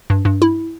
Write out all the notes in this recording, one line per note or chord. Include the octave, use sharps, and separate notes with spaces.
G2
G2
E4